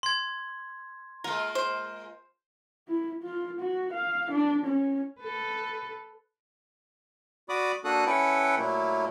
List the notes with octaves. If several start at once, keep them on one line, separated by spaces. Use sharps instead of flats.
C6 G#6
G#3 A#3 F4 A#4
C5
E4
F4
F#4
F5
D4
C#4
A4 B4
F#4 D5 B5 D6 D#6
A#3 D4 F#4 A4 D#6 F#6
C#4 E4 A4 B4 F#5 G5
A#2 F#3 A3 A#3 E4